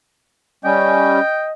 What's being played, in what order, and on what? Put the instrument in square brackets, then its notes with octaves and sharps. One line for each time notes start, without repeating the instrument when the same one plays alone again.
[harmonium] G3 C#4 [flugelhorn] D#5 [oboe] G5